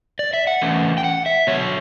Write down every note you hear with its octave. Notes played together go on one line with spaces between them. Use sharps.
D5
E5
F#5
E3 A3 C#4
G5
F#5
E5
D3 F#3 B3 C#5